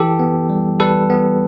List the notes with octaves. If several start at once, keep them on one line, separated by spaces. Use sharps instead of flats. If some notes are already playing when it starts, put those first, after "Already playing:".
Already playing: E3 G4 A4
B3
G3
G3 A4 B4
B3